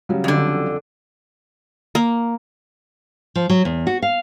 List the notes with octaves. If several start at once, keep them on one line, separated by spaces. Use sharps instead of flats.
C#3 F#3 G3
F2 D3
A#3
F3
F#3
E2
F#4
F5